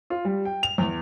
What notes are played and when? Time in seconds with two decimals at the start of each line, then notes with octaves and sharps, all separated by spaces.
0.10 F4
0.25 G3
0.45 G5
0.63 F7
0.78 E2